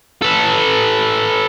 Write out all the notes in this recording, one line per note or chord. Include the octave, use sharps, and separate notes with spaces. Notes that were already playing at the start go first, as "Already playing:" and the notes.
A4 B4